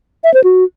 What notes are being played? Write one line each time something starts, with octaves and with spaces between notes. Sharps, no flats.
E5
C5
F#4